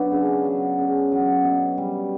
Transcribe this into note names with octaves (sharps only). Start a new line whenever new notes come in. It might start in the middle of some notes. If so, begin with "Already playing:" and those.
Already playing: F#3 B3 D4
C#3
F#3
C#3
F#3
B2
G3